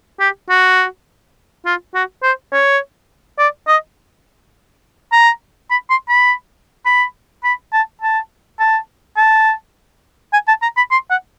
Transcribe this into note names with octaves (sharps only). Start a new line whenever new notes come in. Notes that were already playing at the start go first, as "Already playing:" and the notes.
G4
F#4
F4
F#4
C5
C#5
D5
D#5
A#5
B5
C6
B5
B5
B5
A5
A5
A5
A5
G#5
A5
A#5
B5
C6
F#5